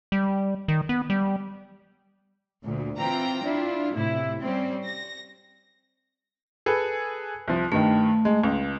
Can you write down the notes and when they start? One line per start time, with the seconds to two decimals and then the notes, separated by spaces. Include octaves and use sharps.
0.12 G3
0.68 D#3
0.89 B3
1.10 G3
2.63 D2 A#2
2.97 E3 C4 F4 G5 A#5
3.42 D4 E4 F4
3.92 A2 C3 E4
4.40 G3 C4 C#4
4.86 A#6
6.66 G#4 A4 B4
7.48 C2 F3
7.72 G2 D#3 A3
8.25 G#3
8.44 C#2